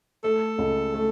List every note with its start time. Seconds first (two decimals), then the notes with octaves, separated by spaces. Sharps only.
0.24 A3 A4
0.59 C#2
0.94 A3